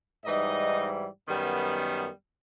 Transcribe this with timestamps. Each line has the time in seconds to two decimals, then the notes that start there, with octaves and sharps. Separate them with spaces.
0.25 G#2 E3 G3 D#4 D#5
1.27 F#2 D#3 G3 B3